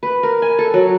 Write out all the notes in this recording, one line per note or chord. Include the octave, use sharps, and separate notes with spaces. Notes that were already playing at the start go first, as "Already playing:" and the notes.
B4
A#4
G#5
A4
F#3